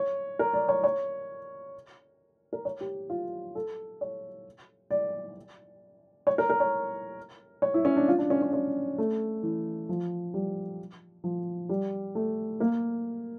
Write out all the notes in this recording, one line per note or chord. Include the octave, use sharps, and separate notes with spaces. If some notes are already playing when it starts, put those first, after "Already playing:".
Already playing: C#5
A#4
D5
C#5
C#5
A#4
C#5
G4
F4
A4
C#5
D5
C#5
A#4
A#4
C#5
C#5
E4
C#4
D4
F4
D4
C#4
C#4
C#4
A3
E3
F3
G3
F3
G3
A3
A#3